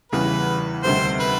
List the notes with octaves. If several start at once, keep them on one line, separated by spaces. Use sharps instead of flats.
E2 C#3 E3 G3 B4
D2 C3 D#3 G3 C4 C5
B4